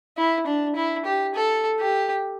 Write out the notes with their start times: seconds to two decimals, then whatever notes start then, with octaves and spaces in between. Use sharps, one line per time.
0.17 E4
0.46 D4
0.76 E4
1.05 G4
1.35 A4
1.80 G4